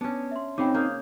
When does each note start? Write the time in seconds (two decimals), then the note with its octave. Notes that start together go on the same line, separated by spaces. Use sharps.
0.01 B3 C#4 D4
0.31 E5 C6
0.58 C#3 C4 D#4 G5 B5 D6
0.74 A#3 D#6 F6 G6